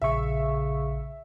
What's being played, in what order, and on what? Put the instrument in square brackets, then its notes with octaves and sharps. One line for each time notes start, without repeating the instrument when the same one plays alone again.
[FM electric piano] A#1 C#6 [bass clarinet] C#3 [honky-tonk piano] E5